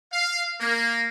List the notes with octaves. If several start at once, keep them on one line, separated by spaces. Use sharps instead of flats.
F5
A#3